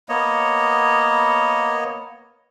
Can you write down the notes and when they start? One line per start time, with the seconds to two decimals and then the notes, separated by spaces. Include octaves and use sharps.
0.09 A#3 B3 C#5 D#5